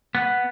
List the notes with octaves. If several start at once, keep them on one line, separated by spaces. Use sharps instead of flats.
B3